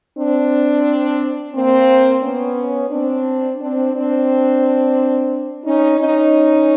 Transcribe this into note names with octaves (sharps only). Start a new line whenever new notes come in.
C4 D4
A#3 C4
B3 C#4
C4 D4
C4 D4
C4 D4
C#4 D#4
C#4 D#4